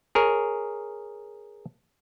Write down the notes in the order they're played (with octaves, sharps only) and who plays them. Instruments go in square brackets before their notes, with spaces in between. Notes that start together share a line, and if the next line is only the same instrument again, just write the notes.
[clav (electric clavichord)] G#4 A#4 C#5